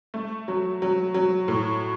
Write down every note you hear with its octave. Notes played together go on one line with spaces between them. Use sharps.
A3
F#3
F#3
F#3
A2